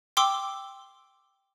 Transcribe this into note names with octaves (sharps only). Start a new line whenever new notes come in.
G5 C6 D6 E6